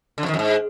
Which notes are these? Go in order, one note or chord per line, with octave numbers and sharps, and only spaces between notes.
D3
F2
D#3
F2
G#2